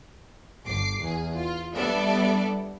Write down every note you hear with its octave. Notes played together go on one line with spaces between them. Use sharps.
G1 D6 C7
E2 G#4
F4
G3 B3 D4 A4 D5 E5